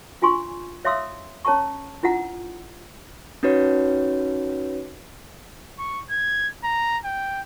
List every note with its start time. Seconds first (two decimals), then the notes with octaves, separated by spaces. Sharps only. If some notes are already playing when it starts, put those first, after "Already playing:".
0.22 D4 F4 G#5 C6 C#6
0.85 C#5 E5 F5 C6 D#6 E6
1.45 C#4 C#5 A5 A#5 C#6
2.03 D4 E4 F4 F#5 A#5
3.43 C#4 D#4 F#4 B4 C#5
5.79 C#6
6.10 G#6
6.64 A#5
7.05 G5